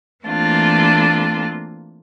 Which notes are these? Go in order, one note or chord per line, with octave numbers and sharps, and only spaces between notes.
E3 A3 A#3 C4 D4 F4